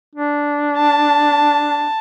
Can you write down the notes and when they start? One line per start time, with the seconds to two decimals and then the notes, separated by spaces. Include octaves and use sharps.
0.15 D4
0.77 A5